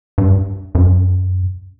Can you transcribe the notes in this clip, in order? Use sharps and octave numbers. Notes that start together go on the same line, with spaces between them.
G2
F#2